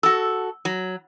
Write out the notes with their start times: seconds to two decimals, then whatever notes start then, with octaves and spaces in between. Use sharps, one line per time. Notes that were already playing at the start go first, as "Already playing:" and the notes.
0.03 F#4 A4 E6
0.65 F#3